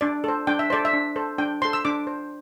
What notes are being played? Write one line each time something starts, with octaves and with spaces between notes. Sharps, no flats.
D4 D5
A4 C5
D4 G5
E5
A4 C5 D5
E5
D4
A4 C5
D4 G5
A4 C5 C6
E6
D4 D6
C5